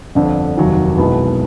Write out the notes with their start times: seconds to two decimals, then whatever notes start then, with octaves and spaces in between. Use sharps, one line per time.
0.15 G1 F2 D3
0.57 F1 D#2 D#3 F#3
0.98 B1 B2 G#3 B3 E4